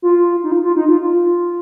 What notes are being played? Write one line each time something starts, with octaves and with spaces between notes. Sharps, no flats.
F4
D#4
F4
F4
D#4
F4
F4